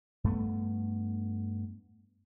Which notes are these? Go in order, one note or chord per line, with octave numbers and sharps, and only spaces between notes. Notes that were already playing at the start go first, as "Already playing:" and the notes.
G2 A3 B3